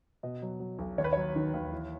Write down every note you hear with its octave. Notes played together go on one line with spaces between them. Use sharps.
B2 D#5
F#3
F#3
B1
D#2 C#5
B4
F#3 C#5
D#3
D#2
E3